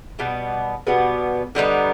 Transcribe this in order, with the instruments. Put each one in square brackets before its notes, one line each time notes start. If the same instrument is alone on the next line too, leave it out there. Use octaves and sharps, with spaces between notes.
[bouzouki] B2 G3 B3
B2 G3 B3
D3 G3 B3 D#4